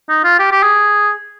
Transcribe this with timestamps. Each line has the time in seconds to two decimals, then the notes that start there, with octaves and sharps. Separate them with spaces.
0.09 D#4
0.24 F4
0.39 G4
0.51 G4
0.63 G#4